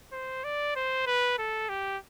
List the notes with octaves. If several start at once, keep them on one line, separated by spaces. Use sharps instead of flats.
C5
D5
C5
B4
A4
G4